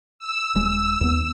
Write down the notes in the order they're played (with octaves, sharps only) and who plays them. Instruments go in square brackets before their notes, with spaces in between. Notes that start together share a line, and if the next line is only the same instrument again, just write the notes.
[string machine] E6
[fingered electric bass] D#1 G#3
D#2 B3